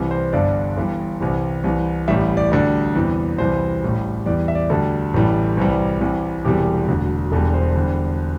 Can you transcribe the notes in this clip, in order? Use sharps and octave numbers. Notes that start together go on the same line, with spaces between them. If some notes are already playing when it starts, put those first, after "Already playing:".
Already playing: C2 C3 E3 G3
C5
G1 G2 D3 G3 D5
G1 G2 E3 G3
C2 C3 E3 G3
C2 C3 E3
A1 A2 E3 G3 E5
D5
D2 D3 G3 D5
E2 C3 E3 G3
C2 C3 E3 G3 C5
A1 A2 G3
E2 E3 G3 D5
E5
D5
D2 D3 G3 A4
A1 A2 E3 G3
C2 C3 E3 G3
C2 C3 E3 G3
E1 E2 C3 E3 G3 G4
E1 D2 D3
E1 E2 D3 G3 A4
C5
E2 D3 G3